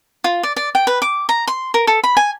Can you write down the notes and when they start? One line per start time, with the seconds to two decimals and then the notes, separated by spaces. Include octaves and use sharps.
0.24 F4
0.43 D5
0.57 D5
0.75 G5
0.87 B4
1.02 D6
1.29 A#5
1.47 C6
1.74 A#4
1.87 A4
2.04 B5
2.17 G#5